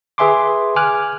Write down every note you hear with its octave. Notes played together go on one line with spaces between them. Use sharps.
G#4 B4 E5 G#5 C6 D6
G#5 D6 F6 F#6